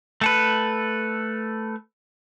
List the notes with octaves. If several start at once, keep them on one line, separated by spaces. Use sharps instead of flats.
A3 A4 B4